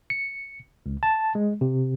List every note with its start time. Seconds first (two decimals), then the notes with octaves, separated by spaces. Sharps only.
0.10 C#7
0.86 C#2
1.03 A5
1.35 G#3
1.61 C3